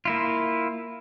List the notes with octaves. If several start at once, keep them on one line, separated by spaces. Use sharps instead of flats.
A#3 E4 F4